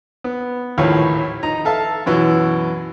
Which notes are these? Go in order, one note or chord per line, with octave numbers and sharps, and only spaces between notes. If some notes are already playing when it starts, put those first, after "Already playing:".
B3
A#1 D#2 A2 B4 C#5 F5
D#4 A#5
A4 E5 F5 A5
F#2 B2 E3